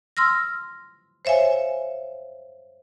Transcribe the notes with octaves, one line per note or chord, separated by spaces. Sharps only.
C6 E6 F6 A#6
C5 C#5 E5 F5 G#5